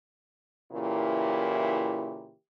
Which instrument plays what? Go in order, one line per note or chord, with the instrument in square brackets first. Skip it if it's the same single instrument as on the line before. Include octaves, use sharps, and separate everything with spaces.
[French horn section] A#2 C#3 E3 E4 G4 A#4